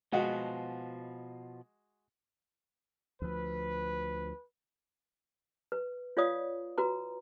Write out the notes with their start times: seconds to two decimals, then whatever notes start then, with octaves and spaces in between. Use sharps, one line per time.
0.12 B2 F3 G#3 F#4
3.22 D2 F3 B4
5.72 B4
6.17 F4 C#5 D5 F5 D#6
6.78 F#4 B4 A#5